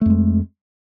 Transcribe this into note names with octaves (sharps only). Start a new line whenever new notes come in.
F2 G#3 A3